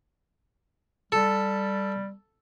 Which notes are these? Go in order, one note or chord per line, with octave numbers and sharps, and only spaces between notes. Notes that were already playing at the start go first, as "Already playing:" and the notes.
G3 A4